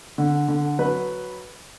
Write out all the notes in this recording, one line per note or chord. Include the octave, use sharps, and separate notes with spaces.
D3
D3
F#3 B4